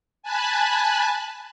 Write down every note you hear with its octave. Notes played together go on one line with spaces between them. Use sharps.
G#5 A5 B5 F#6